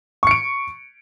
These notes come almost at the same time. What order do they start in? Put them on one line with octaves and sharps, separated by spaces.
C#6 C#7 D7